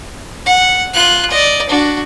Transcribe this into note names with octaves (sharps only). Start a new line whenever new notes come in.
F#5
F4 F#6
D5 D#5
D4 F#4